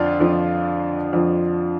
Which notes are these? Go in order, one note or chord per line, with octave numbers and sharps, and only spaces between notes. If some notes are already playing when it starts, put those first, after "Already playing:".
Already playing: F2 D3 D4 F4
F2 D3 F3
F2 D3 F3